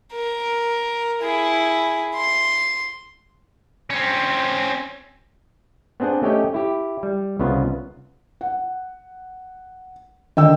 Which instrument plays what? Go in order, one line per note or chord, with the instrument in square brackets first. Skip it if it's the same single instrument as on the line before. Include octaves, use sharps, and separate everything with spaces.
[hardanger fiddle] A#4
E4 G#4
C6
[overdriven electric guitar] C4 C#4
[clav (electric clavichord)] B3 C4 D4 G#4 F#5
A3 C#4 G4 C#5 D#5 G5
E4 G4
G3
C2 C#3 B3 F4
[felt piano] F#5
[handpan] D3 D#3 D4 [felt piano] D#5 G5 E6